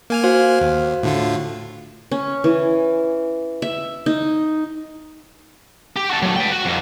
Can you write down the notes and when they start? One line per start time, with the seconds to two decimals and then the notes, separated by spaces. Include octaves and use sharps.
0.10 A#3 G#5 F6
0.24 F#4 C5 F5
0.61 D#2
1.03 A2 D3 F4
2.11 C#4
2.44 E3
3.62 E5
4.06 D#4
5.97 G4
6.10 F#4 A4
6.22 F#3 A3
6.36 B4 G5
6.52 F#4
6.65 F2 A#3